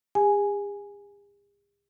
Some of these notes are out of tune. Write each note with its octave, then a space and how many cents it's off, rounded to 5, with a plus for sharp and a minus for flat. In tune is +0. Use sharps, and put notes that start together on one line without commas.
G#4 -45 G#5 +0